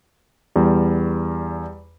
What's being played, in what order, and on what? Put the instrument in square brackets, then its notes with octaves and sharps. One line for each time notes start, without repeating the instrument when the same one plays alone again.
[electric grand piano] E2 [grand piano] G3